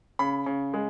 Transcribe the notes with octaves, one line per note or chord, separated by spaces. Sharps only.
C#3 B5
C#3
G#3